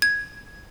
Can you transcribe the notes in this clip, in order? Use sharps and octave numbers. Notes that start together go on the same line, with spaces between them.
G#6